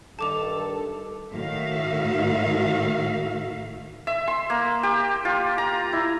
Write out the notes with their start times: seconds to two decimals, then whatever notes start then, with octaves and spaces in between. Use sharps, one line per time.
0.19 G2 D#3 A4 A5 D6 F7
1.32 A2 D#3 F#4 E5 F5
4.07 E5
4.28 C6
4.50 A#3
4.83 G4
5.25 F4
5.58 A#5
5.93 E4